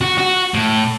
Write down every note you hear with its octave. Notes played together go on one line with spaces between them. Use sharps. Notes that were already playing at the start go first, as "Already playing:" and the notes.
F#4
F#4
A2